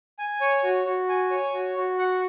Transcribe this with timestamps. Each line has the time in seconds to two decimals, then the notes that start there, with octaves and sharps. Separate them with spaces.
0.19 G#5
0.41 C#5
0.63 F#4
0.85 F#4
1.09 G#5
1.31 C#5
1.54 F#4
1.76 F#4
1.98 F#5